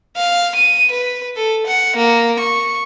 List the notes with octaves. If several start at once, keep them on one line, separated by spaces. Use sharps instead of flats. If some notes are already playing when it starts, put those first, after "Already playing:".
F5
D#7
B4
A4
F#5
A#3
C#6